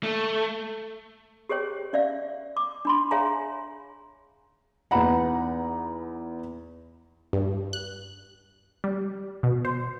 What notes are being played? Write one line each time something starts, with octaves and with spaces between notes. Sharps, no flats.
A3
G4 G#4 C5 C#5 G5
C#4 D5 E5 F5
D6
D4 B5 C6
G#4 C#5 E5 F5 G#5 A#5
E2 D#4 B4 F#5 A#5 B5
G2
F#6
G3
B2
C5